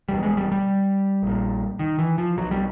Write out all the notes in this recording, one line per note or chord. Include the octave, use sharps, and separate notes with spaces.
E1 E2 B2 G3
G#3
G3
G3
A#1 A#2
D#3
E3
F3
B1 B2 F#3
G3